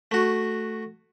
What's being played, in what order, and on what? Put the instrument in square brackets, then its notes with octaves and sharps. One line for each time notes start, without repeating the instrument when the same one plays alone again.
[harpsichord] A3 F#4